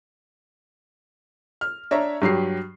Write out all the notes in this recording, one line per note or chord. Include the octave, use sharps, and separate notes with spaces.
F6
D4 C#5 E5 A#5
G2 F#3 G4 C7